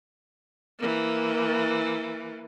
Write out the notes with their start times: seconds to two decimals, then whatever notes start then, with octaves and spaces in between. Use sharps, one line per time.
0.79 E3 A#3